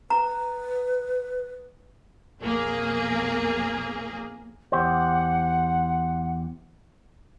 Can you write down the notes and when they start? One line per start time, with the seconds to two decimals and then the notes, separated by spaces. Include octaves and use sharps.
0.10 B4 A#5
2.41 B1 F2 A#3 G#4
4.72 E2 G4 C5 F#5